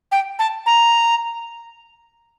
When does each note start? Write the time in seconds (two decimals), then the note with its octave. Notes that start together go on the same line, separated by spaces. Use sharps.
0.12 G5
0.39 A5
0.66 A#5